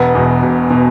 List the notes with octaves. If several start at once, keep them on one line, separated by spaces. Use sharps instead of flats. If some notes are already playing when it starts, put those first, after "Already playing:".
Already playing: E1 B3
E2 B2
E1
B2